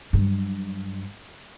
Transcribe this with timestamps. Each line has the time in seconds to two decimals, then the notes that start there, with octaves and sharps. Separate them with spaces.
0.13 G2 F#3